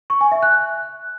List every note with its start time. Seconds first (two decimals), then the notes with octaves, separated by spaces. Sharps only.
0.10 C#6
0.21 G#5
0.32 E5
0.43 F#6